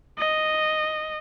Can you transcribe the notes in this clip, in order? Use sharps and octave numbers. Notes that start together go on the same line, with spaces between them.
D#5